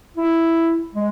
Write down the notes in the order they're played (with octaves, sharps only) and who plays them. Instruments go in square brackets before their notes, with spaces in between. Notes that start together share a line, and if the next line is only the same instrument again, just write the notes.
[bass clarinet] E4
G#3